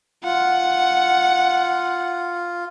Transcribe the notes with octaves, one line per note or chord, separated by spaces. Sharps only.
F4 F#5